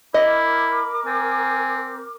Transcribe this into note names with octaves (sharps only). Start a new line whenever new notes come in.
E4 A#4 D#5 B5 D6
C4 G#5